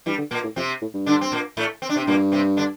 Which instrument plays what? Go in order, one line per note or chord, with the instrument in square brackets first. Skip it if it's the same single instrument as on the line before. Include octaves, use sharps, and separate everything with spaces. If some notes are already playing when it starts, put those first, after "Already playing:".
[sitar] G2 G3 [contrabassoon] E3
[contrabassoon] D3
[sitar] A#2 A#3
[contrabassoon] A2
[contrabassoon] F2 [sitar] C3 C4
[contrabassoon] A2
G2
[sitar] D3 D4
C4
A#2 A#3
A2 A3
C4
D4
C3 C4
[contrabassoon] G2 [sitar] A#2 A#3
[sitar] C3 C4
D3 D4